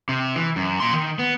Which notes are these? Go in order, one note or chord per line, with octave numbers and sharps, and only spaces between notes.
C3
E3
F#2
A#2 C6
D#3
B3